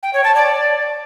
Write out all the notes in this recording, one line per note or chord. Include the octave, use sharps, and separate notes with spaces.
G5
C#5
A5
D5